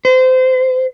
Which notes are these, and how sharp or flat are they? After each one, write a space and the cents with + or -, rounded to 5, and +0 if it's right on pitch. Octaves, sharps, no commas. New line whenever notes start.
C5 -25